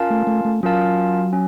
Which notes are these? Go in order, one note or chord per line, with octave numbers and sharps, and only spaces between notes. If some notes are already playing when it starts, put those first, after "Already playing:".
Already playing: C#4 F4 A#4 F5 A5
A3
A3
A3
F#3 C#4 F4 A#4 F5 A5
C#4